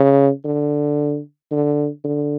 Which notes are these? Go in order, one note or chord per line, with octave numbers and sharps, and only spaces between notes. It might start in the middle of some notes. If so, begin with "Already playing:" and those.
Already playing: C#3
D3
D3
D3